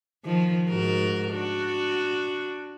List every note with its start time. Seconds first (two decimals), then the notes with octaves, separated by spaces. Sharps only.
0.25 D#3 F3
0.70 G#2 F#4 A#4
1.33 D4 F#4